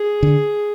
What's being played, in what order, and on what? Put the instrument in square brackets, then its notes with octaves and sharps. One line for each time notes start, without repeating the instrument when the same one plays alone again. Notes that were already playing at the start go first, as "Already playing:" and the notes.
Already playing: [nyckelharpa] G#4
[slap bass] D3